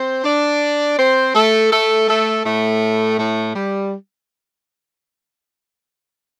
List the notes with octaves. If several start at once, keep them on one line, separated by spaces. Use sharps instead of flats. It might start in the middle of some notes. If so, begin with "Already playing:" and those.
Already playing: C4 C5
D4 D5
C4 C5
A3 A4
A3 A4
A3 A4
A2 A3
A2 A3
G3